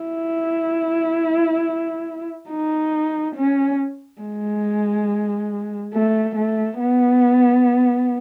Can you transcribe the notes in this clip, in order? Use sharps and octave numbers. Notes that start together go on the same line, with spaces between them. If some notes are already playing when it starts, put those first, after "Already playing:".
Already playing: E4
D#4
C#4
G#3
A3
A3
B3